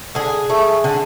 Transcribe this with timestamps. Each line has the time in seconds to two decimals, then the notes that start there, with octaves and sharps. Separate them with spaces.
0.15 D3 G#4
0.50 A3
0.84 D3